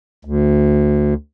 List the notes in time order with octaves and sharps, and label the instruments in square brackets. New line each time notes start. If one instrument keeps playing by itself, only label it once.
[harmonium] D2